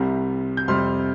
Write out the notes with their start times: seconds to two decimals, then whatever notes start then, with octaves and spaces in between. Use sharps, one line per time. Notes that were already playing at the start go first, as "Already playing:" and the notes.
Already playing: C2 C3 G3
0.57 G6
0.68 F2 C3 G3 C6 F6